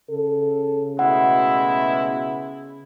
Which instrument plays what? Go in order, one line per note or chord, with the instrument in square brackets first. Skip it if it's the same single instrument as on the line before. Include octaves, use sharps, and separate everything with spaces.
[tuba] C#3 [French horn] A4
[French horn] B2 [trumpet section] G#3 A3 E4 [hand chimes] F#5